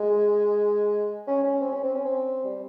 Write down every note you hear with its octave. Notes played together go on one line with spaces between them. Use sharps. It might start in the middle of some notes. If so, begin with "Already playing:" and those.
Already playing: G#3
C#4
C#4
C4
C#4
C4
C#4
C4
G3